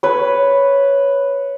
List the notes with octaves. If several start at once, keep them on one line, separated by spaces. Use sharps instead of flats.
B4 C#5